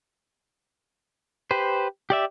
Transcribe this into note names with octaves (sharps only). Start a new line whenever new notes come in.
G4 B4 C5
G4 D5 E5